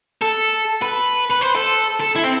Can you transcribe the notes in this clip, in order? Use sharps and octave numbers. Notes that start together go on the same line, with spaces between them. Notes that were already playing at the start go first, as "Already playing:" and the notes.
A4
B4
B4
C5
A4
A4
E4
C4